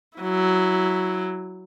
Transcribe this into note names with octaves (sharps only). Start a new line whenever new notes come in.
F#3 E4